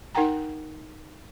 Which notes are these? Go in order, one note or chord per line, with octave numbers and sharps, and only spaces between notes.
D#4 A#4 F#5 G5 A#5